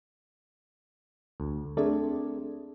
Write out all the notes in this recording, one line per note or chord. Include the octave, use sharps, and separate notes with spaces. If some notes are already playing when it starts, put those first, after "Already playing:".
D2
A3 C4 D4 G#4 A#4 D5